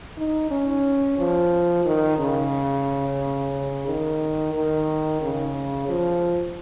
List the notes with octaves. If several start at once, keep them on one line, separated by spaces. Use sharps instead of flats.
D#4
C#4
F3
D#3
C#3
D#3
D#3
C#3
F3